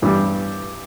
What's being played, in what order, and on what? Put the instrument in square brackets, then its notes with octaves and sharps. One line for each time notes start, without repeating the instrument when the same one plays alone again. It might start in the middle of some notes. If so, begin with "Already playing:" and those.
[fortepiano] G2 E3 G3